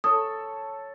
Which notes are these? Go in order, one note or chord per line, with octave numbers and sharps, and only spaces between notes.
A4 C#5 D#6